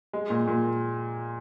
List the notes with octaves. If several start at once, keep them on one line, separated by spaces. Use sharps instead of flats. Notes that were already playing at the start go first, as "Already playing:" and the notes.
G#3
A#2
A#2